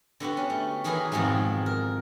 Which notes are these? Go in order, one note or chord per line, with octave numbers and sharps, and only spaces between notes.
D3 B3 F#4 G4
C#4
A3
D#3 E3 G#4 B4 A#5 C6
F2 G#2 B2 D#3 G#3
A#4